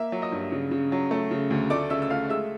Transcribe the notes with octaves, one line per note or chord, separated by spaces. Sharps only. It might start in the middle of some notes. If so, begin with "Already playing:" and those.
Already playing: A#3 E5 E6
F#3
D#5 D#6
G2
C#3
C#3
F#3
A3
C#3
D2
A3 D5 D6
C#3 E5 E6
E6
A3 F5 F6
G#3 E5 E6